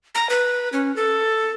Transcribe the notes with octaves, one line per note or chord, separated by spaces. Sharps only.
A#5
B4
C#4
A4